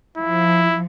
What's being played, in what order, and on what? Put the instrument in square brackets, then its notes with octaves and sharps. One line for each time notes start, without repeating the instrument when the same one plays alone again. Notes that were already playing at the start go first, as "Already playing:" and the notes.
[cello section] F3 [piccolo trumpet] E4